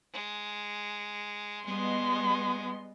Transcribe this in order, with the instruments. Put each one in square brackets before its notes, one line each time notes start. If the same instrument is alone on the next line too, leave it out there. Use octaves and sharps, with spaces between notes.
[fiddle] G#3
[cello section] G3 B3 D#5 [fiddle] G#3 [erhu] C6